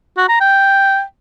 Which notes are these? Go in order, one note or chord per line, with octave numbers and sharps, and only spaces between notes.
F#4
A#5
G5